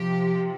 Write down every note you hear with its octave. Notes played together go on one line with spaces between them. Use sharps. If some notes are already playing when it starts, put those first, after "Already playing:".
Already playing: C3 F3 G4